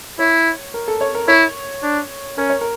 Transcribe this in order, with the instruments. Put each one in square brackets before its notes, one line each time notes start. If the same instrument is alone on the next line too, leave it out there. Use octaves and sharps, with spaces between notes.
[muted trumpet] E4 [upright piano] C#5
[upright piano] A#4
A4
C#5
A#4
[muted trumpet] E4 [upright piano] C#5
[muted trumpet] D4
[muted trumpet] C#4 [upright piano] A#4
[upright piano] C#5
A#4